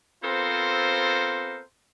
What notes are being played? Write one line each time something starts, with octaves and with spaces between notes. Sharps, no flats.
B3 C4 F4 A4 A#4 C5